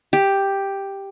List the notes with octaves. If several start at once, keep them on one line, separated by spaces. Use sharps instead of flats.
G4